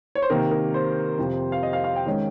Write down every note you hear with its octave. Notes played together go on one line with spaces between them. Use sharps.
C#5
C5
C3 D#3 A#3 A#4
A#4
C5
F2 C3 F3
F5
D#5
F5
F5
G5
D#3 G#3 C#4